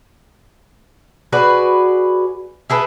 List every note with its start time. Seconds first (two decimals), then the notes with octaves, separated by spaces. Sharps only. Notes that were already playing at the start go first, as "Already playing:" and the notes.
1.32 F#4 G#4 B4 D5
2.70 E4 G#4 A4 B4